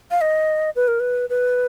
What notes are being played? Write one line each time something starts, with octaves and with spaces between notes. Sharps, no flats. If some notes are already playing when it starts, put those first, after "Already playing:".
F5
D#5
B4
A#4
B4
B4